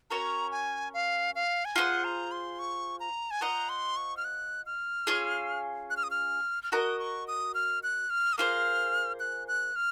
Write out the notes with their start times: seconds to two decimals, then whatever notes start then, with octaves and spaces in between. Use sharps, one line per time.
0.10 C#4 F#4 A#4 C#5 A#5
0.52 G#5
0.94 F5
1.35 F5
1.65 G#5
1.76 F4 G#4 C5 F#5
2.04 A#5
2.32 C6
2.59 C#6
3.00 A#5
3.31 G#5
3.41 F4 C5 D#5 F#5 A#5
3.69 C6
3.97 C#6
4.17 F6
4.25 F#6
4.66 F6
5.07 C#4 F4 G#4
5.90 F#6
5.97 F6
6.03 D#6
6.11 F6
6.63 F6
6.72 F#4 A#4 D#5 D#6
7.00 C#6
7.28 D#6
7.55 F6
7.83 F#6
8.10 F6
8.33 D#6
8.38 A#3 F4 G#4 C5 F6
9.20 F#6
9.48 F#6
9.76 F6